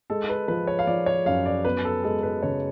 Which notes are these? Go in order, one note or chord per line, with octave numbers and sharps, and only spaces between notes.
G#3 A4
B4
F3 B4
C#5
F5
F3 D5
C#5
F#2 F5
D5
B3 B4
A4
G#3 A4
B4
C#3 C#5